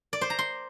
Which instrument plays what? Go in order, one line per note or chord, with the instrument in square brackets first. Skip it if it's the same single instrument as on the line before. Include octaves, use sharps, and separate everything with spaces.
[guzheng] D5
C5
A#5
C6